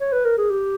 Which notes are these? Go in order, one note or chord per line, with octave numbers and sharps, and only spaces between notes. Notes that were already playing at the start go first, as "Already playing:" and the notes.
C#5
B4
A#4
G#4
G4